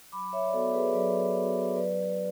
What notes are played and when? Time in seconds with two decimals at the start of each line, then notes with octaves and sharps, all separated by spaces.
0.12 F#3 B5 D6
0.33 C#5 E5
0.48 D5
0.53 B3 F#4 A4 C#5
0.74 G#4 B4
0.94 F#3 B4 D5
1.36 B3 F#4
1.76 F#3 B4 D5